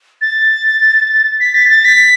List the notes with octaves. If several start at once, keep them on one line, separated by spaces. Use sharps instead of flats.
A6
B6
A6
A6
B6